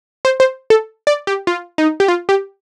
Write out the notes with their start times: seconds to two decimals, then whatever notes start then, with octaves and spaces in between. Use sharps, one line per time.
0.25 C5
0.40 C5
0.70 A4
1.07 D5
1.27 G4
1.47 F4
1.78 D#4
2.00 G4
2.08 F4
2.29 G4